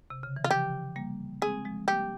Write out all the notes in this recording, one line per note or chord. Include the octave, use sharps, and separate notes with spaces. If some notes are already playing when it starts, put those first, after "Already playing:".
C3
C#3
E3
F4
C#3 F3 G4
G3 A#3
G#3 C4 G#4
F3 G#3
G3 A#3 G4